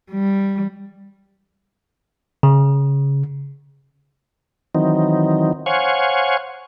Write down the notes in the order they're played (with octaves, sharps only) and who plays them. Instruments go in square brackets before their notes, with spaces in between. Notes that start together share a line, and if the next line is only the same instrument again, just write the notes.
[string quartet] G3
[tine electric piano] C#3
[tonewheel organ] D#3 E3 F#3 C4 D#4
C5 C#5 F5 F#5 G#5 C#6